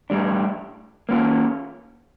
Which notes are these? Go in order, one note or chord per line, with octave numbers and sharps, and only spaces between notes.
A2 G3 D4
A#3 C#4 F4